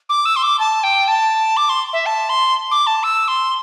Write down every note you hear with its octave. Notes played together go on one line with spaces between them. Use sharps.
D6
E6
C6
D6
A5
G5
A5
D6
C6
E5
A5
C6
D6
A5
E6
C6